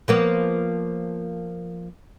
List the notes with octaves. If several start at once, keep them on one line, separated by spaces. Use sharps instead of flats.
F3 A#3 B3